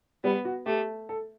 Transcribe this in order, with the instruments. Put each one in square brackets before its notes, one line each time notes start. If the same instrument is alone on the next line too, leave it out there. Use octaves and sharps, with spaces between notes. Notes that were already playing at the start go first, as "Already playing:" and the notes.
[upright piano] G3 [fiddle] B3
[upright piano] F#4
[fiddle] A3 [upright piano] G4
[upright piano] A4